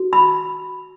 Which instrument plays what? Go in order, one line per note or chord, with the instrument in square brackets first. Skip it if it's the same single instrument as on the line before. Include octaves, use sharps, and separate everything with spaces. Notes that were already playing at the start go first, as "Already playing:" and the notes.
Already playing: [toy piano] F#4
B5